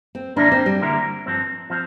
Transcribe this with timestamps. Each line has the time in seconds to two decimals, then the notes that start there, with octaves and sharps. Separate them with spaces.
0.15 C4
0.36 D3 G3 A#3 D4 E4 A#4
0.52 C4
0.66 G3
0.81 D3 G3 A#3 E4 A#4
1.26 G2 F3 C4
1.70 F3 C4